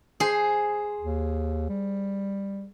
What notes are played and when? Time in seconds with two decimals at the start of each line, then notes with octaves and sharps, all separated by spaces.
0.20 G#4 C5
1.01 D#2
1.69 G3